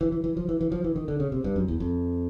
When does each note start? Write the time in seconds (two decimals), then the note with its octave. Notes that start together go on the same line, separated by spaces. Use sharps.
0.01 E3
0.12 E3
0.24 E3
0.37 F3
0.49 E3
0.61 E3
0.72 F3
0.84 E3
0.96 D#3
1.08 D3
1.20 C#3
1.32 C3
1.44 G2
1.56 F#2
1.68 E2
1.80 F2